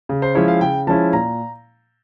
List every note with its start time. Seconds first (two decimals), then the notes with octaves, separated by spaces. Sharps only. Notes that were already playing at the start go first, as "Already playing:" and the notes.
0.09 C#3
0.22 C5
0.35 F3 G#3 C#4 E4 C#5
0.48 F5
0.61 C#3 G5
0.87 F3 G#3 C#4 E4 A5
1.13 A#2 A#5